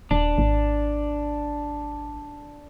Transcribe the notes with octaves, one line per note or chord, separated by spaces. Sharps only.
D#1 D4
G#1